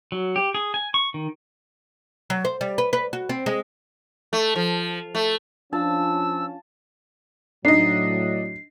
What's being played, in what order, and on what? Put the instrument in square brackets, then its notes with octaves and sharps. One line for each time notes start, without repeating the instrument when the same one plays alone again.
[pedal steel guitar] F#3
G4
G#4
G#5
C#6
D#3
[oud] F#3
C5
G3
B4
B4
F#4
C4
G#3
[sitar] A3
F3
A3
[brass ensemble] F3 C#4 [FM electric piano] D4 F4 F5 [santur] A5 [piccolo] E6
[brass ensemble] A2 F#3 [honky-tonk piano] D4 D#5 [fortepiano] D#4 [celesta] C7